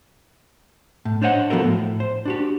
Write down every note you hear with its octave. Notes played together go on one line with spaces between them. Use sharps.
A2
D4 C5 C#5 D#5 F#5
F3 B3 F#4 A4 A#4
A2
C5
D4 F#4 G4